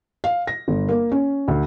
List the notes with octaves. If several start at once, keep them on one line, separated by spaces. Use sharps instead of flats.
F5
A#6
G1
A#3
C#4
D2